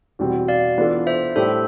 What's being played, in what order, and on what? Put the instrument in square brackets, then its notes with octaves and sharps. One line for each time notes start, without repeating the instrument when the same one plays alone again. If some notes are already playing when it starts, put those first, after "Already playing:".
[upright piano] E2 B2 G3 C4
[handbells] D5 F5
[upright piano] E3 B3 D4 F4 A4
[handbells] C5 E5
[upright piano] A2 G3 D4 G4 [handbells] A4 C5